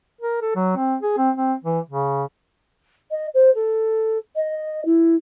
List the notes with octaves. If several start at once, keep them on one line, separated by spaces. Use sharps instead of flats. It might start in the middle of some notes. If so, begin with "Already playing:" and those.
A#4
A4
F#3
C4
G#4
C4
C4
E3
C#3
D#5
C5
A4
D#5
E4